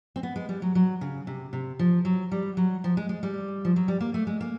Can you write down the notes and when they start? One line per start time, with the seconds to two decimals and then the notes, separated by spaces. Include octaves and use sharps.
0.16 C4
0.23 B3
0.36 G#3
0.49 G3
0.62 F#3
0.75 F#3
1.01 C#3
1.27 C3
1.53 C3
1.79 F3
2.05 F#3
2.32 G3
2.57 F#3
2.84 F3
2.97 G#3
3.09 G#3
3.23 G3
3.65 F3
3.76 F#3
3.88 G3
4.00 A#3
4.14 A3
4.27 G#3
4.41 A#3